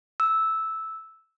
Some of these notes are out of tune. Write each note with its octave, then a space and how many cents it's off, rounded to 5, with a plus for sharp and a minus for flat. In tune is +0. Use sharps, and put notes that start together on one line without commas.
E6 -10